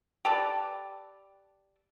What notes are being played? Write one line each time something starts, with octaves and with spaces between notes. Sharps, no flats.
G4 A4 B4 D5